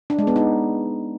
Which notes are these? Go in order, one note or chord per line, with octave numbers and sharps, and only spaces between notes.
D4
G#3
B3
D#4